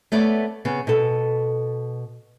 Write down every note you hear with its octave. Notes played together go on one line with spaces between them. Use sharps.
A3 B3 C#5 D5
C#3 B3
B2 A4